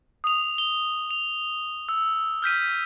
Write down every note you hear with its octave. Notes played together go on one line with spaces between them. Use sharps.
D#6 F7
G7
F7
E6
F6 G6 B6 D#7